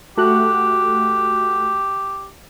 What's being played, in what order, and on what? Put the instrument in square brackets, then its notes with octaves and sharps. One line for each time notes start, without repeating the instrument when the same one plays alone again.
[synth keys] A3 F#4 F#6 [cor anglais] G4